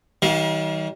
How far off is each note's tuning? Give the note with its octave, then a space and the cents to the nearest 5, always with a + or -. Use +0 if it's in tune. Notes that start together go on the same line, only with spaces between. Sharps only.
D#3 +35 G3 -40 F5 +0